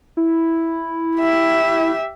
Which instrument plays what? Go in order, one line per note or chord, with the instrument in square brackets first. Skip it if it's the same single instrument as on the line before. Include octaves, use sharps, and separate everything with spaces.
[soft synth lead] E4
[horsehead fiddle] G4 E5